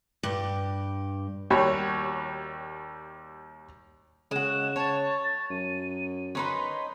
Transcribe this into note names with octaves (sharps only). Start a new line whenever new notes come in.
G2 G4
D#2 G3 F#4 C#5 B5
C#3 G#3 F#4 E7
C#5 A5
A6
F#2 D#7
C#4 D#4 B4 C6